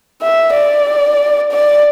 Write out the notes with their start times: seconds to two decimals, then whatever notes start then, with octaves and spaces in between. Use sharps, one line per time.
0.22 E5
0.54 D5
1.52 D5